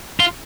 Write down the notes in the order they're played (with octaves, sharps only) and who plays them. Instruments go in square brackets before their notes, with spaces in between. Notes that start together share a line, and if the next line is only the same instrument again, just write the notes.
[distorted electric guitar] F4